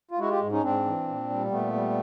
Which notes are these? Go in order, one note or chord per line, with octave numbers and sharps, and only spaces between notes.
F4
G#3 E4 F#4
F4 G4
G#2
C#4 D#4
G#2 C4 D4
E3
A#2
G3
A#2 A3 B3
G3